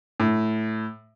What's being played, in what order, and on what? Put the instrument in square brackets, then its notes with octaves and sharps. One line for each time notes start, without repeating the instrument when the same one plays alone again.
[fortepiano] A2